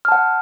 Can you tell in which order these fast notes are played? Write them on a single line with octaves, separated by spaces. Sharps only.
F6 A5 F#5